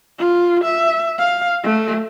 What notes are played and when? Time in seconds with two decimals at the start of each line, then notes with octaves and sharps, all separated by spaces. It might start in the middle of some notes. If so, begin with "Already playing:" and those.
0.18 F4
0.64 E5
1.19 F5
1.63 A3